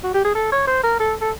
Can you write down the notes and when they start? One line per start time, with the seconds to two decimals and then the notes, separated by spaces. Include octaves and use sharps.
0.03 F#4
0.14 G4
0.25 G#4
0.35 A4
0.52 C#5
0.67 C5
0.83 A#4
1.00 A4
1.21 A4